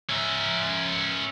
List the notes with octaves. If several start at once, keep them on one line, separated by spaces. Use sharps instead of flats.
C#4 E5